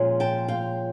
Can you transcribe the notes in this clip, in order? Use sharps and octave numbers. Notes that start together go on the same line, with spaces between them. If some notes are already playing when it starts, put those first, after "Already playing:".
Already playing: A#2 F3 G#3 C#4
G5 A5
F5 G5